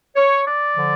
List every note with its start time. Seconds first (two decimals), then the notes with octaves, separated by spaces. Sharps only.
0.16 C#5
0.46 D5
0.76 D3 F3